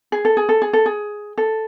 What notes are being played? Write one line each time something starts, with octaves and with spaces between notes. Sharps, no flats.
G#4
A4
G#4
A4
G#4
A4
G#4
A4